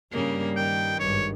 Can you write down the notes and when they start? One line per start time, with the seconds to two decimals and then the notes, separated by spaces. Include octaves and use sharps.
0.11 G2 C#3 G3 A#3
0.56 D#3 G5
1.00 G#1 G2 C#5